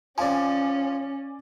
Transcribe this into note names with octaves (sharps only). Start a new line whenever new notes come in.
F3 C4 C#4 D5 G#5